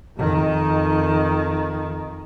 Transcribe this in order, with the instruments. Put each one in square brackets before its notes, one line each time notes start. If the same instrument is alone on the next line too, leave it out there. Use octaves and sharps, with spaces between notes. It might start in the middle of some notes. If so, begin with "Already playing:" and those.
[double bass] F2 D#3